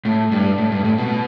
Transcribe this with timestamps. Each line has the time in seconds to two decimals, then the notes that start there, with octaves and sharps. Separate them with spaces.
0.05 A2
0.32 G2
0.58 A2
0.72 G2
0.84 A2
0.98 B2